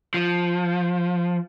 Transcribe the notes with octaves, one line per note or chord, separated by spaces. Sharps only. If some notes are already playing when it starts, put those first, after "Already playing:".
F3